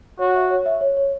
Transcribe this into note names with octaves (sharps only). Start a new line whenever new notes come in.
F#4 C#5
E5
C#5
E5
C#5
C#5